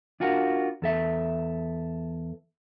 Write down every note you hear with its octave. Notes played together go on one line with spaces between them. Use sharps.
D4 F4 F#4 A#4
E2 A4 E5